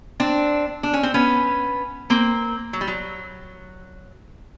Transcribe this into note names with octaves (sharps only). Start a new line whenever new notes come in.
C4 D4
D4
C#4
C4
B3 C#4
A#3 C4
F#3
G3
F#3